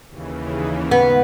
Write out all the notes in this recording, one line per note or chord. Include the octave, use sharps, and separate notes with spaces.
D#2 C#3 E3
G#2 D#3 B3